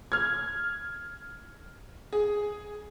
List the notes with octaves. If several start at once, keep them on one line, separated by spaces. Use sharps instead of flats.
F6 G#6
G#4